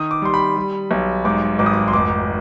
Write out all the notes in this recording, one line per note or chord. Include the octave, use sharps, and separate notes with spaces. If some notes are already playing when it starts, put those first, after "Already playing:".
Already playing: D#3 D#6
D6
G3 C6
B5
G3
B1
G#2 D6
G#1 D6
D#6
D6
C6
F1 D6